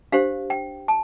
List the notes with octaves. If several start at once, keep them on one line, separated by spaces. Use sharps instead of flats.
D4 G4 C5 F5
G5
A5